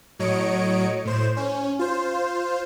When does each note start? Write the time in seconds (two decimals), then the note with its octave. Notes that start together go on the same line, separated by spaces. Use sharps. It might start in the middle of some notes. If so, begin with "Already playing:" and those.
0.19 A2 F#3 C#5 D#5 C#7 D7
1.05 A2 C5 E7
1.37 C#4
1.79 F4 C5